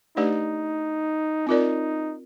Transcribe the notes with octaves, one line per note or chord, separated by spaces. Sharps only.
A3 D4 D#4 G4 B4 D5
C4 D#4 F4 A#4 D5